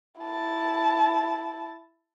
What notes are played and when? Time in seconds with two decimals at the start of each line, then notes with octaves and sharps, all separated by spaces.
0.21 E4 A5